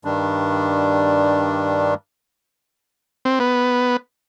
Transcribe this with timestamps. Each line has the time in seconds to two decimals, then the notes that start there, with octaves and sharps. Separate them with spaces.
0.05 G2 D#3 G3 D4
3.25 C4
3.40 B3